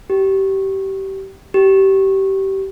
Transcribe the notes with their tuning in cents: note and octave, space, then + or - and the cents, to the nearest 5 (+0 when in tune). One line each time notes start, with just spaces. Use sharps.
G4 -25
G4 -25